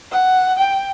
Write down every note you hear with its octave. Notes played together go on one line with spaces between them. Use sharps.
F#5
G5